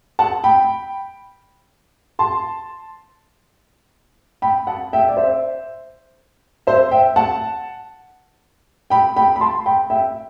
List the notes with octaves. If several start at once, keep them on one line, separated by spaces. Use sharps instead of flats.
F#5 A5
G5 B5
A5 C6
G5 B5
F#5 A5
E5 G5
D5
C5 E5
C5 E5
E5 G5
F#5 A5
G5 B5
G5 B5
B5
A5 C6
G5 B5
E5 G5